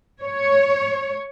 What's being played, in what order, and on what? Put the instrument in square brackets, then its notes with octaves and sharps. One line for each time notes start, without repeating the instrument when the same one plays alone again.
[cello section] C#5